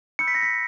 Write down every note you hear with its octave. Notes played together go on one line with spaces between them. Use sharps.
B5 E6 G6 C#7
B6
A#6
B6